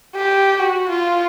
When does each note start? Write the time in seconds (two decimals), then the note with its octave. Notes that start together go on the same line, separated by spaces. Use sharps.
0.16 G4
0.60 F#4
0.89 F4